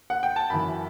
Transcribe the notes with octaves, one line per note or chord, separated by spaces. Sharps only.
F#5
G5
A5
F#2 E3 B5